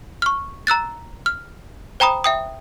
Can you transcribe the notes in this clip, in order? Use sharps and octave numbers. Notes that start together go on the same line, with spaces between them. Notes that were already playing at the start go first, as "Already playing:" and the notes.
C#6 F6
A#5 E6 F#6 A6
F6
C5 G5 A#5 B5 D#6
E5 G5 D#6